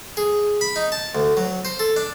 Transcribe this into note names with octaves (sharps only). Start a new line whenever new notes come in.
G#4
B5
D#4
A5
D2
F#3
C5
A4
D4